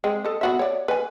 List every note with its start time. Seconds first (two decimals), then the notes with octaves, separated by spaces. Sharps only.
0.04 G#3 C4
0.25 A4 D#5
0.41 B3 F#4 E5
0.59 C#5 D5
0.88 B4 G#5